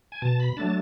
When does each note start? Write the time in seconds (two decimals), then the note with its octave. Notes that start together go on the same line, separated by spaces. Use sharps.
0.12 G#5
0.22 B2 A5
0.40 B5
0.57 F#3 A3 D4 A5